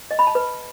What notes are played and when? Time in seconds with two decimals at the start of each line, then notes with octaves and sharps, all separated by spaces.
0.11 D#5
0.19 B5
0.27 A5
0.35 B4